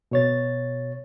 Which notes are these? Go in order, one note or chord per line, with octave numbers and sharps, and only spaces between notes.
B2 C#5 A6